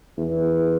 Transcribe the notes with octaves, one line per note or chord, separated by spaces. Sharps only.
E2